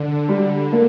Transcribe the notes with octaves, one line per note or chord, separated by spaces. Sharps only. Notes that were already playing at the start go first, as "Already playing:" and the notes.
Already playing: D3
G3
A#3